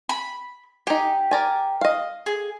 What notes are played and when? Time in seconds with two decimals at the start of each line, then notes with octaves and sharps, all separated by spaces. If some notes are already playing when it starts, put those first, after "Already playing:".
0.09 B5
0.87 D#4 G4 G#5
1.31 A#4 D5 G#5
1.81 D#5 F5
2.26 G#4